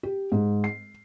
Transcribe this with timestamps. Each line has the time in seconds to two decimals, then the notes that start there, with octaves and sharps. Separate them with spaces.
0.03 G4
0.32 G#2
0.64 C7